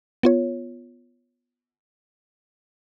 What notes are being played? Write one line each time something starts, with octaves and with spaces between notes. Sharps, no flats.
B3 F4 C#5